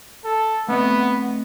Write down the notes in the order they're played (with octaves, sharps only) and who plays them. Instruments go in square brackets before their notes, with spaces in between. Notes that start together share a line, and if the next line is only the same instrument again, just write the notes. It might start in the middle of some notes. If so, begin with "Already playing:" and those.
[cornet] A4
[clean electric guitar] A3 C4 D#5 [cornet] B3